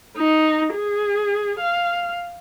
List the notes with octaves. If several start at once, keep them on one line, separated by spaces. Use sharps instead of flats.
D#4
G#4
F5